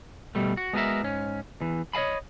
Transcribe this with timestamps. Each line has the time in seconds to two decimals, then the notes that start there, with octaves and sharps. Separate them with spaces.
0.35 B2 G3 A3
0.57 F#4
0.73 G#3 B3 F#4 G4 A#4 E5
1.03 G#2 C#4
1.61 E2 E3
1.93 C#5 D#5 F5 G#5 B5